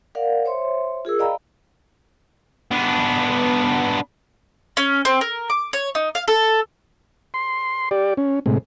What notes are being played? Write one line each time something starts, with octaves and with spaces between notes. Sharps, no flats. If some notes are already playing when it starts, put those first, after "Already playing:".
A#4 D5 F5 F#5
C5 C#5 E5 C6
F4 G#4 A#4 E6
D5 D#5 F5 G5 A#5 B5
B3 D4
C#4
C4
A#4
D6
C#5
D#4
F5
A4
C6
G4 D5
C#4
A2 C3 G#3